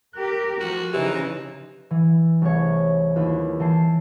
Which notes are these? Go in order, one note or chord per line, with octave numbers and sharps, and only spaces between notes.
G4 A#4 F#6
F3 F#4
C#3 E3 F3 D#4 G4
E3
C2 A3 G#4 C#5
D#2 E4 F4 B4
E3 G5 A5 C7